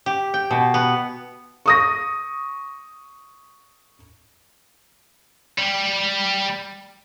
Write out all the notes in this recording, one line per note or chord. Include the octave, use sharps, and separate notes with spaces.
G4
G5
B2
B3
C#6 D#6 A#6
G3